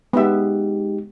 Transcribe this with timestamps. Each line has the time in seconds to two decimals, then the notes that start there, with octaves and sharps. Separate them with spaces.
0.13 G#3 B3 D#4 G4 E5